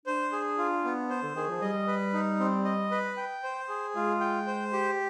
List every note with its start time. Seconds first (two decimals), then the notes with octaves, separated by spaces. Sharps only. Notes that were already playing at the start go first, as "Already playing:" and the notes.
0.06 D4 C5
0.32 G#4
0.58 F4
0.85 B3
1.10 C5
1.22 D3
1.35 D#3 G#4
1.48 F3
1.62 G3 D#5
1.87 B4
2.13 D#4
2.40 C4
2.65 D#5
2.91 B4
3.17 G5
3.43 C5
3.69 G#4
3.95 G#3 F4
4.21 G5
4.47 C5
4.73 G4